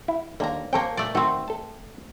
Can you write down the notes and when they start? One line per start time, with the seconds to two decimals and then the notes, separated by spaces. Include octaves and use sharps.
0.08 E4
0.40 D#2 D3 A#3 A#5
0.73 A#3 C4 A4 C#5 G5
0.97 A#2 A3 D5
1.15 D#3 A3 C4 F#4
1.48 A4 A5